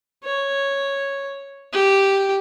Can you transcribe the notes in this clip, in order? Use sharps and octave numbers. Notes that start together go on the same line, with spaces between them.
C#5
G4